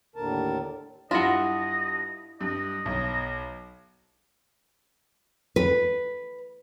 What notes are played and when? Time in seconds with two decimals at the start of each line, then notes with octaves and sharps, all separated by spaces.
0.16 D#2 A2 D3 A#4 A5
1.11 G2 E4 F4 D#5 F#5 A#6
2.41 G2 D#5
2.86 B1
5.56 B4